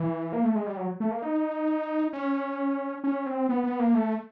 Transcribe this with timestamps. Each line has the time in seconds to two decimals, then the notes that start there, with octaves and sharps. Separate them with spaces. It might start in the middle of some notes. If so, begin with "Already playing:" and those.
Already playing: E3
0.33 A#3
0.44 A3
0.55 G#3
0.66 G3
0.77 F#3
1.00 A3
1.11 A#3
1.22 D#4
2.13 C#4
3.04 C#4
3.26 C4
3.49 B3
3.64 B3
3.80 A#3
3.94 A3